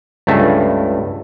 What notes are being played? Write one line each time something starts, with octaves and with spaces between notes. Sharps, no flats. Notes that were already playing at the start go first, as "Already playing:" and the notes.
C#2 G2 A3